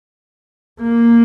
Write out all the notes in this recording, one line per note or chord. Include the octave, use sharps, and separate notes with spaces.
A#3